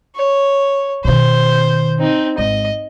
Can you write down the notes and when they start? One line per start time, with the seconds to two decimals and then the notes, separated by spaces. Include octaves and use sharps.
0.16 C#5
1.05 B2 D#3 C5
1.99 C4 D#4
2.38 G#1 D#5